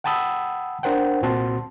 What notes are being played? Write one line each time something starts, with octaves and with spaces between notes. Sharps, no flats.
F#5 G5 A5 B5 D#6 E6
D4 A#4 C5 F#5 G5
C2 A#2 C4 F#4 A5 C6